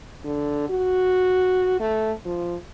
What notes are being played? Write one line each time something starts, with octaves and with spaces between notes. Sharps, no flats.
D3
F#4
A3
F3